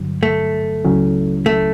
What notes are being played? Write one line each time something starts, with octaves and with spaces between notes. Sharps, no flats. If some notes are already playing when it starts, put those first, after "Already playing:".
Already playing: G2 D3 F#3
A3
C#2 C#3 F#3 C#4 E4
A3